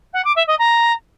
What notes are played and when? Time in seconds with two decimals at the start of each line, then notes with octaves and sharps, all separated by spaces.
0.13 F#5
0.24 D6
0.36 E5
0.47 D#5
0.58 A#5